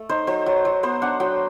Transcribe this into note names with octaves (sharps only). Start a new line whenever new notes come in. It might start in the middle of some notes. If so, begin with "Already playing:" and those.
Already playing: A3
D#4 C5
F#3 C5
F#3
F#3
B3 C5
D4 F#5
F#3 G5